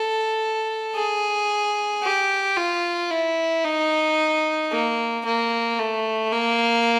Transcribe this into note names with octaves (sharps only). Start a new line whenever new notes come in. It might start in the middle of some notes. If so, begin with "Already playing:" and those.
Already playing: A4
G#4
G4
F4
E4
D#4
A#3
A#3
A3
A#3